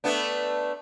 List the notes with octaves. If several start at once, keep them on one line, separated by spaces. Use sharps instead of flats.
A3 B3 D4